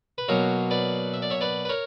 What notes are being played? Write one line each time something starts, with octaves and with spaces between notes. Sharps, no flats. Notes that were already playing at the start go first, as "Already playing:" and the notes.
B4
B2 F#3 A#3 A#4 C#5
B4 D5
E5
D5
C#5 E5
B4 D5
B4
A#4 C#5